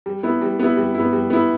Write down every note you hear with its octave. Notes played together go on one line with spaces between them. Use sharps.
G3
B3 E4
G3
B3 E4
G3
E4
B3
G3
B3 E4